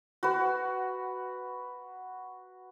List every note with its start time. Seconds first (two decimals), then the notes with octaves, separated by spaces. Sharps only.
0.23 F#4 B4